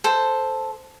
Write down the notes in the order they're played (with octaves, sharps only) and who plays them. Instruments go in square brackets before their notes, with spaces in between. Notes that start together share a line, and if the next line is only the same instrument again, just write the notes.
[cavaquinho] A4 C5